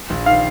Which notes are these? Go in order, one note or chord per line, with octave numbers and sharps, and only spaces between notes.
A#1
D#3 F5